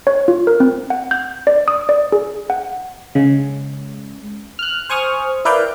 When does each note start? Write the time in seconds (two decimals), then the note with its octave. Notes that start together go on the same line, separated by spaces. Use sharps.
0.07 C#5
0.28 F4
0.47 A#4
0.60 C4
0.90 F#5
1.11 G6
1.47 D5
1.68 D#6
1.89 D5
2.12 G#4
2.50 F#5
3.15 C#3 G#3
4.59 F6 F#6
4.90 C5 G#5 C#6 D#6 F6
5.45 E4 A#4 B4 D5 F5 G5